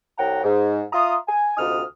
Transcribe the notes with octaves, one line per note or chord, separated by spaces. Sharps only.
C2 C#5 F#5 G5 A#5
G#2
F4 E5 A#5 C6 D#6
G#5
D2 C3 D#4 F4 D#6 F6